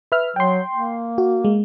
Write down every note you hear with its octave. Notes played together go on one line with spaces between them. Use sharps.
B4 E5 F6
F#3 G5 C6
A#3
F#4
G#3